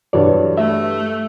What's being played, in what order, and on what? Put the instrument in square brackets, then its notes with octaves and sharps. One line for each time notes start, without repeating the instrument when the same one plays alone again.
[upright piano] G2 E3 F#3 [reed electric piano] A4 C#5 D5
[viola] A3 [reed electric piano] E5